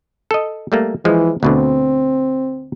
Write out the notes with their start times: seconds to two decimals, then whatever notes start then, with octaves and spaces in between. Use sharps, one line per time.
0.31 A4 D#5
0.72 G3 A3 A#3
1.05 E3 F3 G#3
1.43 D2 B2 D3 C4